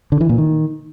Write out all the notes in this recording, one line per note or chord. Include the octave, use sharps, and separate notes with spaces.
D3
E3
A#2
D#3